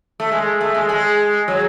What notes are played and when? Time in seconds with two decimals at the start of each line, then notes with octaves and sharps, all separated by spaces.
0.20 A3
0.32 G#3
0.61 A3
0.75 G#3
0.89 G#3
1.48 F#3